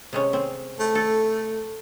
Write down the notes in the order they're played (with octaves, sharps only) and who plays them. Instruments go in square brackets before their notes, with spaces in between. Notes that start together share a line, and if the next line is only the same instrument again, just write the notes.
[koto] C3 G#3 C#4
C4
[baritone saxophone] A3
[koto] A4